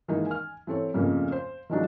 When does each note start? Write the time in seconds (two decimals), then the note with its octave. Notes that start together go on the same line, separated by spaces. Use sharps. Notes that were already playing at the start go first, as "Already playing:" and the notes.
0.08 D#3 E3 G#3 A#3 D#4
0.27 G#5 F6
0.67 E3 C4 A4 C#5
0.94 F2 A#2 C#3 A3 A#3
1.32 C5
1.70 D#3 F3 F#3 G#3 D4 D#4